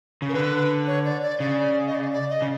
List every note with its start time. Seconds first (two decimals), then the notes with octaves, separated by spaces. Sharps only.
0.22 C#3
0.29 A#4
0.34 D3 B4
0.87 C#5
1.05 D5
1.23 D5
1.40 C#3 D5
1.87 D#5
1.95 D5
2.12 D5
2.30 D#5
2.42 C#3